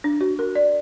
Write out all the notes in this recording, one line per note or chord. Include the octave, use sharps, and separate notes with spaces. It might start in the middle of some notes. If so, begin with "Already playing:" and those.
D4
F#4
A#4
D5